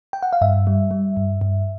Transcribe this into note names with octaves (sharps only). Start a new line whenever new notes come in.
G5
F#5
F5
G2 E5
G3
G3
G2
G2